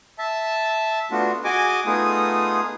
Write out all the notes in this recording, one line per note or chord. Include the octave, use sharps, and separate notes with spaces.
E5 A5
A3 B3 D4 F4 F#4
F#4 G#4 D#5 G#5 D6
A3 B3 D#4 F4 G#4 D#6